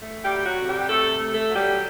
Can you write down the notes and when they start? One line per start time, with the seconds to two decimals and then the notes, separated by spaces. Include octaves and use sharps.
0.02 A3
0.24 G3 G4
0.31 F#3
0.46 F#3 F#4
0.60 C3
0.68 G3 G4
0.89 C3 A3 A4
1.19 A3
1.34 A3 A4
1.49 F#3
1.55 G3 G4